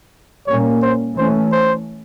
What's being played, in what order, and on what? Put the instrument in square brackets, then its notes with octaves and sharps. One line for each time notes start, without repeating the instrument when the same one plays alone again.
[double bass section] A#2 G3 A#3 C#4 [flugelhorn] C#5
[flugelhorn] C5
[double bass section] E3 A3 C#4 [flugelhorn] C5
[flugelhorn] C5